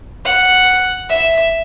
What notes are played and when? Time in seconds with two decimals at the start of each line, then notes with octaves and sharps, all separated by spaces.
0.25 F#5
1.09 E5